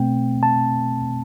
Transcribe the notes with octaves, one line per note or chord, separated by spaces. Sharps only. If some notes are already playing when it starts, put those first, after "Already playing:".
Already playing: B2 A3 C4 G5
A5